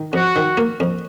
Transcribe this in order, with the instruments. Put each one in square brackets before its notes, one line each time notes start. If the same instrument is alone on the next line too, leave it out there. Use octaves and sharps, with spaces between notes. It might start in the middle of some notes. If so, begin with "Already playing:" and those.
Already playing: [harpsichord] D#3
[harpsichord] F2 [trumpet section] F#4
[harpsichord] D#3
A#3
F2